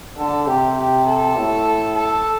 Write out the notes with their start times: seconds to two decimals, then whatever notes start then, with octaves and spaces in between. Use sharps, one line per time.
0.18 D3 A4
0.47 C3 G4
0.77 G4
1.06 A4
1.36 A2
1.95 A4